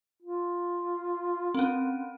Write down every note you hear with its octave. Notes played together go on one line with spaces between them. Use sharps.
F4
C4 C#4